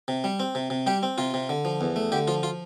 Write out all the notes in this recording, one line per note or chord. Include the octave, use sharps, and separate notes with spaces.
C3
G3
C4
C3
C3
G3 G4
C4
C3 F4
C3
D3
F3
E2
A3
D3 G4
F3 F4
F4